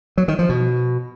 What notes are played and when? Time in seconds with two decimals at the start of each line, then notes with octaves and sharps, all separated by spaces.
0.18 F#3
0.28 D#3
0.39 F3
0.49 B2